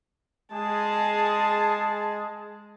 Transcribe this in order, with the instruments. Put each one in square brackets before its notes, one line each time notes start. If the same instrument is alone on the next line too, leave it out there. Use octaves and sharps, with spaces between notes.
[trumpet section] G#3 G#4 [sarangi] A5